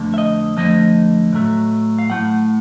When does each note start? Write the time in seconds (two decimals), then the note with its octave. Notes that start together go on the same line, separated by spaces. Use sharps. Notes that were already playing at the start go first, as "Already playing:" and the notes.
Already playing: F2 D3 F3 A3
0.14 E5
0.18 D#5
0.56 F2 D3 F3 A3 D#5
1.33 A2 F#3 A3
1.99 F5
2.10 A2 F#3 A3 F#5